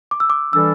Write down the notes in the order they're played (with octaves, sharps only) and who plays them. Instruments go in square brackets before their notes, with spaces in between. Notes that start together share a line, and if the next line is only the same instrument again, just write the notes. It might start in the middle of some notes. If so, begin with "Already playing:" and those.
[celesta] D6
E6
D6
[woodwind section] E3 G3 D4 A4 [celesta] E6